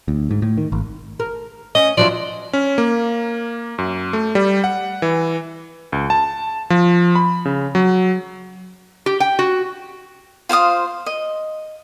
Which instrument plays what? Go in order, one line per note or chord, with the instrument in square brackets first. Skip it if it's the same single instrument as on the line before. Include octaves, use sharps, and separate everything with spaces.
[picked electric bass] D2
G#2
A2
D#3
G#1
[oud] A#4
[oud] C#4 [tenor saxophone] D#5
[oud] F3 F#3 E4 [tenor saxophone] D5
[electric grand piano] C#4
A#3
F#2
A3
G3
F#5
E3
C#2
A5
F3
B5
C#3
F#3
[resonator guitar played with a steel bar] G4
G5
F#4
[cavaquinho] F4 C5 F5 D#6
D#5